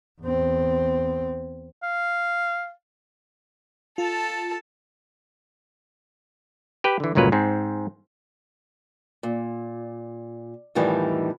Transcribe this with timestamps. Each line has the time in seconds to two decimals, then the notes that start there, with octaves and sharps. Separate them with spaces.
0.21 E2 C4
1.83 F5
3.98 F4 A4 A5
6.84 G4 B4 G5
7.00 D3 E3
7.15 G1 C#2 A#2 F#3 B4 F5
7.32 G#2 C4
9.23 A#2
10.75 F2 A2 D#3 E3 G3 D#4